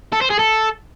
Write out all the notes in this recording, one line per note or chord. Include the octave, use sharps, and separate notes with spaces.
A4
C5
G#4
A4